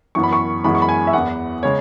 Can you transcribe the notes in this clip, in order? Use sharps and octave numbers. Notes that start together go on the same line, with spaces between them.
F#2 E3 B3 C#6
B5
C#6
F#2 E3 G#3 B3 B5
C#6
B5
G#5
E5
E2 E3 B3 F#5
C#3 G#3 C#5